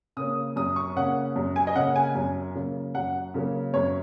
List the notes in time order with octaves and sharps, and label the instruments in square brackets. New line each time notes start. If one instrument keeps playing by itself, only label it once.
[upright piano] C#3 A#3 C#4 D#6
F#2 D#6
C#6
C#3 A#3 C#4 F#5
F#2
G#5
D#5
C#3 A#3 C#4 F#5
G#5
F#2
C#3 F#3 A#3 C#4
F#2 F#5
C#3 F#3 A#3 C#4
F#2 C#5